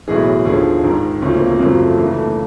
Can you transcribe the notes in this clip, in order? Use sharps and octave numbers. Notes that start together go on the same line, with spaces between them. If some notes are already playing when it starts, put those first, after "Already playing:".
B1 A2 E3 G#4
D#2 D3 F3 G#4
A#1 G#2 D#3
D2 C#3 F3 C#4
A#3
A#3
G#1 F#2 C#3 F3 A#3
A3
D2 C#3 E3 A#3
A3
A#3